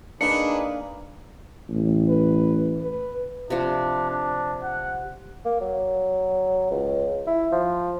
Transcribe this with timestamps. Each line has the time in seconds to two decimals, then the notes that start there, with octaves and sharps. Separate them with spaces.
0.21 A#3 D4 D#4 G#4 B4 C#7
1.69 A1
2.09 B4
2.81 B4
3.50 C3 F3 D4
4.10 D4
4.62 F#5
5.45 A#3
5.61 F#3
6.71 C#2
7.27 E4
7.52 F3